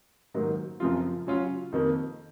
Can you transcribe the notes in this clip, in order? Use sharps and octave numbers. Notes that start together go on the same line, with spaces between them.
G#2 D#3 F#3 A#3
F#2 C#3 F3 C4 F4
C#3 F#3 C#4 F4
F2 D#3 A#3